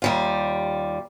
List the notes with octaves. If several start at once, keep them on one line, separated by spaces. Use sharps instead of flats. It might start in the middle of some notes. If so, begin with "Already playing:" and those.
D#2 G3 F4